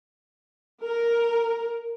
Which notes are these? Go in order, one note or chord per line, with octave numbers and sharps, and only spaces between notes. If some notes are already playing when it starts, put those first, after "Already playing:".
A#4